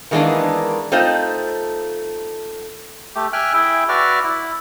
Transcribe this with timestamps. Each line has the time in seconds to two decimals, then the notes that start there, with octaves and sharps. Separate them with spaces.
0.11 D#3 E3 G#3 A#3 B3 D4
0.92 A3 C4 D#4 F4 C5 D#5
3.15 A3 G4
3.33 E5 G5 G#5 F6 F#6
3.54 E4 G#4 E5 G5
3.89 F#4 B4 D5 E5 D6 F6
4.24 E4